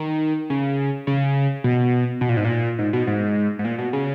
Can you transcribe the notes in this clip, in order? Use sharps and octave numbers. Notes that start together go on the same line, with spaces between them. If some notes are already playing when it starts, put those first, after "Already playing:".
Already playing: D#3
C#3
C#3
B2
B2
A#2
G#2
A#2
G#2
B2
G#2
G#2
A#2
B2
C#3